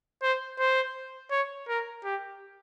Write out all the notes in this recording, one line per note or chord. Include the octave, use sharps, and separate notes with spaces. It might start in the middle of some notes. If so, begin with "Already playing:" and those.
C5
C5
C#5
A#4
G4